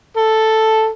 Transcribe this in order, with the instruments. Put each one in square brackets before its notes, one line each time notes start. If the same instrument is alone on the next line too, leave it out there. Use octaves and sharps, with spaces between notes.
[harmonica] A4